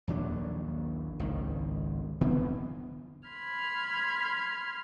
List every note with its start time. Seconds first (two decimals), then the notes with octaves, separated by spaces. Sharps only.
0.08 A#1 D#2 F#3 D4
1.20 G#1 C#2 D#3
2.21 D3 B3 C4
3.29 B5 C6 F6 G#6